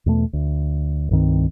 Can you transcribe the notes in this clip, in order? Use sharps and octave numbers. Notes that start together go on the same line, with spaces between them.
E2 B2 A3
D2
C2 G2 D#3 C4